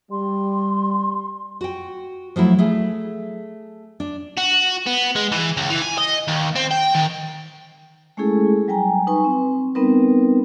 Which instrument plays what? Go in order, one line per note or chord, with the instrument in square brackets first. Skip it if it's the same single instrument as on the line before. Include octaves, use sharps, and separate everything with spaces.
[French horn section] G3 [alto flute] C6
[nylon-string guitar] F#4 G5
F3 F#3 A3 E4
A3 G#4
D4
[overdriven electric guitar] F#4
B3
G#3
E3
C#2
E3
G#5
D#5
D#2
C4
G5
D#3
[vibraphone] G#3 A3 C#4 E4 G#4 A4
F#3 G3 G5 G#5 A#5
D#4 B4 G#5 C#6
C4
G3 B3 C4 D#4 A#4 B4